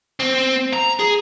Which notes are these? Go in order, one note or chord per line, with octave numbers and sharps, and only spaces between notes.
C4
A#5
G#4